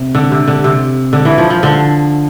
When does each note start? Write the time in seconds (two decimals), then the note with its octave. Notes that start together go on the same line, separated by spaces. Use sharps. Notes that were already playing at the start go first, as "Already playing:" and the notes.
Already playing: C3
0.15 D3
0.31 C3
0.48 D3
0.64 C3
1.13 D3
1.25 E3
1.38 F3
1.50 F3
1.63 D3